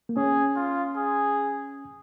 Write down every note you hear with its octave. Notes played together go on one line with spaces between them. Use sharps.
A#3
C#4 G#4
F4
G#4